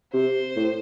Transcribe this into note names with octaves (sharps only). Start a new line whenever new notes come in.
C3 C5
A2